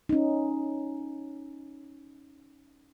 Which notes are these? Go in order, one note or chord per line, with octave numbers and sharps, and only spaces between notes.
C#4 D#4